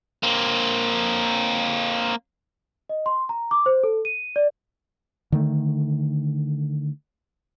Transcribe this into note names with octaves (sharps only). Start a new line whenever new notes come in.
A#3 C4
D#5
C6
A#5
D6
C5
A4
D#7
D5
D3 D#3 A3